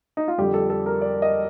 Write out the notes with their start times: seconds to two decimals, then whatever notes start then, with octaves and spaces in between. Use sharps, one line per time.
0.17 D#4
0.28 F4
0.38 F2 D3 G3 G4
0.54 A4
0.70 A4
0.86 A#4
1.01 D5
1.22 D#5